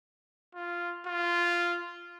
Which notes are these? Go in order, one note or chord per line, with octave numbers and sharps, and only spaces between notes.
F4
F4